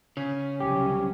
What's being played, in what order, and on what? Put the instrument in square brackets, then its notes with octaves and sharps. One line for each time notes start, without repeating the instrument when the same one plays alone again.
[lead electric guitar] C#3 [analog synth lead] C#4
[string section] C2 F#3 [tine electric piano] G4